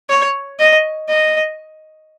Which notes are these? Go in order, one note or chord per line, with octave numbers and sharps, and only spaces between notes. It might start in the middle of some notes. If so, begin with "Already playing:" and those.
C#5
D#5
D#5